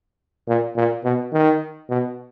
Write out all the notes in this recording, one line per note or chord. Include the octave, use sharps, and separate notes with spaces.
A#2
A#2
B2
D#3
B2